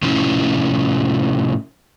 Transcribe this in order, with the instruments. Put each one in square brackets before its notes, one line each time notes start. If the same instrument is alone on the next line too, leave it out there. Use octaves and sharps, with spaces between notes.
[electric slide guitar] A2 C3 F3 C#4 E4